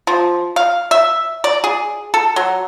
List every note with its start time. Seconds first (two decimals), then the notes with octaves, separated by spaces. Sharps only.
0.07 F3
0.56 F5
0.91 E5
1.44 D5
1.64 G#4
2.14 A4
2.36 F#3